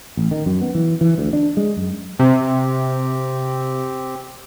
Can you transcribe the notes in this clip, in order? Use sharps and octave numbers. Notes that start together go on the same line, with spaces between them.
A1
D#3
F#2
B3
E3
E3
D2
D4
G#3
F#2
C3 C4 G4